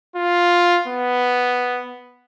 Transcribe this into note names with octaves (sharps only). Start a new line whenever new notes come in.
F4
B3